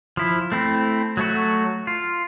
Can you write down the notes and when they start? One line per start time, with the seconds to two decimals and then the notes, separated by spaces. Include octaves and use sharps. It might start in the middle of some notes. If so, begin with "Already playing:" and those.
0.17 F3 E4
0.52 A3 C4 E4
1.17 F#3 A3 F#4
1.87 F4